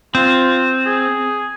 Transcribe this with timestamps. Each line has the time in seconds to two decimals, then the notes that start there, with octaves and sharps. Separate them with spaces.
0.15 C4 F4
0.86 G#4